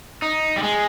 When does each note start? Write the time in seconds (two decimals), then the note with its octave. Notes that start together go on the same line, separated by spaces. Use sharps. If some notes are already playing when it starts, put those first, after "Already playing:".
0.22 D#4
0.56 G3
0.63 G#3